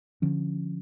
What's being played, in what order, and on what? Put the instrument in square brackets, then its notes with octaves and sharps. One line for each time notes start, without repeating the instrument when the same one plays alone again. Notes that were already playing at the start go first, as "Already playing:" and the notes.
[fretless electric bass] D3 F3 C#4